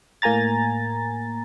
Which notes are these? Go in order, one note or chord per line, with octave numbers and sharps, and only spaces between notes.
A2 A#3 G#5 A#5 A6